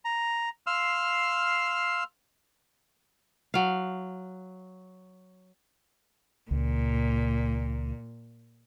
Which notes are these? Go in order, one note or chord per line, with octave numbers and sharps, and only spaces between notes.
A#5
F5 C6 E6 F6
F#3 F5
C#2 A#2